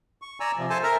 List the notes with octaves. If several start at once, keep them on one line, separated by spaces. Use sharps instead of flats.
C#6
D5 G#5 A#5 E6
C3 F3
A4 C5 G#5 A5
A#4 E5 A#5 F6